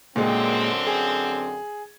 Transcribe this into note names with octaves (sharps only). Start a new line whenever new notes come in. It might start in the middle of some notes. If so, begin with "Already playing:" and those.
F#2 A#2 D3 G#3 C4
G#4